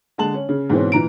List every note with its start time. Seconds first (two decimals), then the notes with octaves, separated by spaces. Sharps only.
0.18 D3 G#3 A5 F#7
0.34 C#4
0.49 C#3
0.70 G#2 B2 E3 C4 C#4
0.92 A#2 E3 A#5 D7